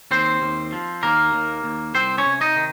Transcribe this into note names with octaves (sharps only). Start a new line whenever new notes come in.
D#2 C4 C5
D#2
F3
D#2 A#3 A#4
D#2
D#2
C2 C4 C5
C#4 C#5
C3
D#4 D#5
D#3